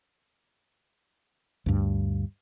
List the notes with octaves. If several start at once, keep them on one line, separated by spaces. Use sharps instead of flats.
D2 G2